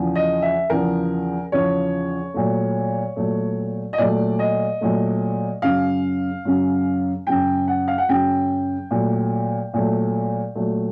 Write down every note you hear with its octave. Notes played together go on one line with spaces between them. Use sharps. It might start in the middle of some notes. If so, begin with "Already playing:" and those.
Already playing: E2 C#3 F3
D#5
E5
E2 C#3 F3 A#4
E2 C#3 F3 C#5
A#2 F#3 A3
A#2 F#3 A3
D#5
A#2 F#3 A3 D5
D#5
A#2 F#3 A3
F#2 C#3 F#3 F5
F#2 C#3 F#3
F#2 C#3 F#3 G5
F#5
F5
F#5
F#2 C#3 F#3 G5
A#2 F#3 A3
A#2 F#3 A3
A#2 F#3 A3